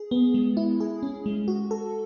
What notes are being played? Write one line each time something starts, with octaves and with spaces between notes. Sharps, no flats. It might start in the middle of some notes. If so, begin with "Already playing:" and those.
Already playing: G#4
B3
G#3
E4
G#4
C#4
G#3
F#4
A4